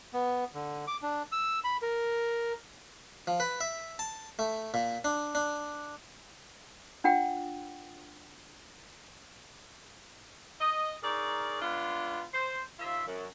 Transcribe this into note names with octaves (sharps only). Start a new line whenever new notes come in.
B3
D3
D6
D4
E6
B5
A#4
F3
B4
E5
A5
A3
A#2
D4
D4
D4 F4 F#5 G5
D#5
D#4 G#4 A#4 C#5 D5
G#3 B3 D4 F4
C5
D#2 A#3 F4 E5
F#2